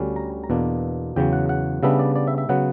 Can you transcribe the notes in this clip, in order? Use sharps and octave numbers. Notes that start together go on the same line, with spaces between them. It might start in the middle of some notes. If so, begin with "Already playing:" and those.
Already playing: D2 D3 G3 C#4
A#5
A#5
E2 B2 A#3 D4
E2 C#3 F#3 G5
F#5
F#5
C#3 G3 B3 D4 E5
D5
D5
E5
E5
C#3 F#3 B3 F#5